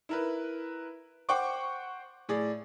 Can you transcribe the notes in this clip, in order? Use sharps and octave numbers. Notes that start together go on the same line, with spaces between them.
E4 A#4 B4
C5 F#5 G5 C#6 D6
A2 G#4 D5